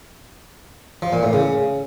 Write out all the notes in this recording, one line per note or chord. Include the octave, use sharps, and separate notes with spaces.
F3
A#2
A2
C#3